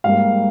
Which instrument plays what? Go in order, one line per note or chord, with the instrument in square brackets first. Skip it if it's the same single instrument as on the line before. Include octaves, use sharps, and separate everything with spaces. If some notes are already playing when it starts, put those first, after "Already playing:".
[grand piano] G#2 G3 A#3 F5